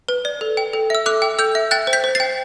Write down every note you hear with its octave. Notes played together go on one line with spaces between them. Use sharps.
B4
D5
A4
G5
A4
E5 E6
A4 D6 F#6
G5
A4 E6 G6
E5
G5 F#6 A6
C5
G6 B6
C5
G5 A6 C7